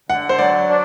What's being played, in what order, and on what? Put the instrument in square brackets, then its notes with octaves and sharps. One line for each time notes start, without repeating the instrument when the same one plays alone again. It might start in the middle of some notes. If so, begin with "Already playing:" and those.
[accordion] D3 [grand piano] F#5
[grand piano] C5
[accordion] F#3 [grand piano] D5
[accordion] D4